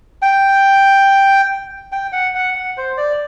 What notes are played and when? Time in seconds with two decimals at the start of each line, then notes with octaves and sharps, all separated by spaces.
0.22 G5
1.92 G5
2.12 F#5
2.35 F#5
2.56 F#5
2.77 C5
2.97 D5